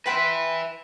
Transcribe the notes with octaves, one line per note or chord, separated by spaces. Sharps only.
B4 E5 G5 B5 C6